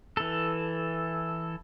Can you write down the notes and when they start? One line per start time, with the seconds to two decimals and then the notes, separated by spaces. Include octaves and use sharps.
0.17 E3 A4